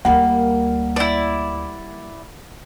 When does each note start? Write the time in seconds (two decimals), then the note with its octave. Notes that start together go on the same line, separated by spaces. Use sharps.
0.05 D2 D3 G3 A#3 F#5
0.96 E4 D5